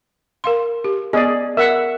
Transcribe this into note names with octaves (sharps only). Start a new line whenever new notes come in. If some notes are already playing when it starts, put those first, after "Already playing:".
A#4 F5 C6
G4
B3 G#4 D5 D#5
A#4 E5 F#5